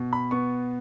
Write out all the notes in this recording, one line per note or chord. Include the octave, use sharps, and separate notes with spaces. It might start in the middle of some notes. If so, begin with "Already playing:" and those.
Already playing: B2
B5
B3 C#6